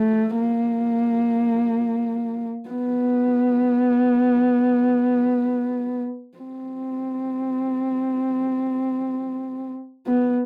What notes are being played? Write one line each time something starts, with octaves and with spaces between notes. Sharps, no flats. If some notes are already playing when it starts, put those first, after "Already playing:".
Already playing: A3
A#3
B3
C4
B3